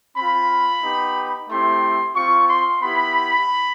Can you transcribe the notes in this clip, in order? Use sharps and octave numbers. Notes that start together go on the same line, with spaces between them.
C4 F4 B5
B3 D#4 G4
A3 C4 E4 G4 C6
C4 F4 C#6
C6
B3 E4 G4 B5